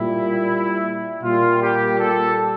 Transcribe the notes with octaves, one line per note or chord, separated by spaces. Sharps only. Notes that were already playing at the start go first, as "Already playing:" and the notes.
Already playing: A#2 G3 E4
A#2 G3 F4
G4
A4